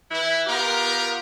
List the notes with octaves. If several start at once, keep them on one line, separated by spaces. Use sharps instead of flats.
E3 E4
B3 F4 G4 A#4